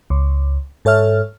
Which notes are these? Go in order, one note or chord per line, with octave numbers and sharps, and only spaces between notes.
C#2
G#2 A4 C#5 E5 F6